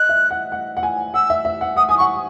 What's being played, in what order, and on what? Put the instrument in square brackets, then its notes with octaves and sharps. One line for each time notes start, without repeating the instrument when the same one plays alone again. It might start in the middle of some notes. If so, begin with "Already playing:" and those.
Already playing: [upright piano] D#5 [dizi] F#6
[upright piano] E5
F#5
F#5
F#5
G#5
[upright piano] F#5 [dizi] E6
[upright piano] E5
E5
F#5
[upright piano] F#5 [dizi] D#6
[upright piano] G#5 [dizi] D#6
[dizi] C#6
[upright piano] F#5